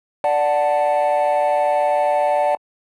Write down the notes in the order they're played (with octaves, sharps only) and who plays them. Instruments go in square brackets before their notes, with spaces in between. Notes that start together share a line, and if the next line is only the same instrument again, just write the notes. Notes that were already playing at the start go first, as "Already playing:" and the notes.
[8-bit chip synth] D5 F#5 A5